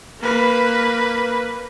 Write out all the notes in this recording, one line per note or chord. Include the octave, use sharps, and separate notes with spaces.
A#3 B4